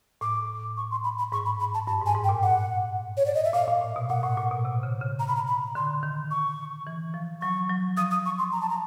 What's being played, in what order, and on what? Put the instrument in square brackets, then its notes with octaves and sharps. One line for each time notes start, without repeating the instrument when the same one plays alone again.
[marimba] A2 [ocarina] D6
[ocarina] C#6
C6
B5
B5
[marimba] G#2 [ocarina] C#6
[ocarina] B5
B5
A5
[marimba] G2 [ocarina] A5
[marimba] G#2
[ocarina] G#5
[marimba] G#2
[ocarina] G5
[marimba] A#2
[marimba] A#2 [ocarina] F#5
[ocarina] C#5
D5
D#5
E5
[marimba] A#2 [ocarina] F5
[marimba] A#2
A2
B2
[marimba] A#2 [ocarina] F#5
[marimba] A2
A#2
B2
C3
C#3
C#3
[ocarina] A#5
B5
A#5
B5
[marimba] D3 [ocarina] C6
[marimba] D#3
[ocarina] C#6
[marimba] E3
F3
[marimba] F#3 [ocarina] C#6
[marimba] F#3
[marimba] F3 [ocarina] D#6
[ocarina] D#6
C#6
C6
A#5
A5
A#5